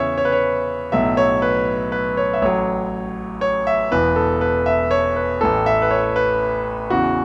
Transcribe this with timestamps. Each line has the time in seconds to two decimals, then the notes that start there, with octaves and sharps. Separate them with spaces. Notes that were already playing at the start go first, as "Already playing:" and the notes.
Already playing: E2 C#3 E3 C#5 E5
0.18 C#5
0.25 B4
0.32 C#5
0.92 B1 A2 F#3 E5
1.17 C#5
1.42 B4
1.92 B4
2.17 C#5
2.34 E5
2.42 A1 A2 F#3 C#5
3.41 C#5
3.67 E5
3.91 E1 E2 E3 B4
4.16 A4
4.41 B4
4.66 E5
4.91 C#5
5.16 B4
5.41 A1 A2 E3 A4
5.66 E5
5.82 B4
5.91 C#5
6.16 B4
6.90 E2 C#3 E3 F#4